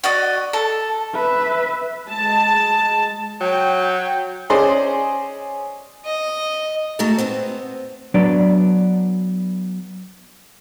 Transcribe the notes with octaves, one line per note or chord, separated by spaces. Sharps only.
F#4 D5 D#5
A4
B4 E5
G#3 A5
F#3 G5
C#4 G#4 C5 D5 D#5
D#5
A3 F#4 G#4 A5 A#5
B3 C4 C5
F#3 B3 D4 D5